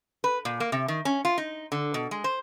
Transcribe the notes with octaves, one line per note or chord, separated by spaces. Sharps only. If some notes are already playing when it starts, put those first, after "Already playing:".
B4
A#2
A#3
C3
D#3
C#4
F4
D#4
D3
B2
G#3
C5